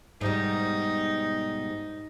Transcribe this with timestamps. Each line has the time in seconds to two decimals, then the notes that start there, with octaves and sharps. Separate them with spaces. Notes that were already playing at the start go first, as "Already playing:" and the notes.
0.21 G#2 B2 G3 D#4